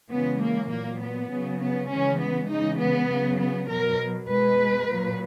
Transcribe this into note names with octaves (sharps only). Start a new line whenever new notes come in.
C#3 E3 G#3 B3
A#3
A#2 F#3 A#3
B3
C#3 F#3
B3
C#3 E3 G#3 C#4
B3
C#3 E3 G#3 D#4
B3
C#3 F#3
B3
B2 F#3 A#4
B2 G#3 B4
A#2
F#3